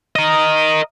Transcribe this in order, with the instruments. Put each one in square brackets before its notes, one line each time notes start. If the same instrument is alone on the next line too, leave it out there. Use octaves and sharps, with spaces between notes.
[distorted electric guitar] A#4 D#5